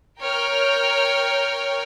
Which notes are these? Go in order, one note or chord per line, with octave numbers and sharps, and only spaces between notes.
A#4 C#5 G5 A#5 F6